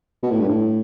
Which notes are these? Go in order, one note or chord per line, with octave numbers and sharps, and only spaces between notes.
B2
A2
G2
A2